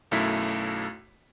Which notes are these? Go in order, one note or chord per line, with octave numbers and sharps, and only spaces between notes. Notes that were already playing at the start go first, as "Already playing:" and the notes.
B1 F#2 A3 E4 B6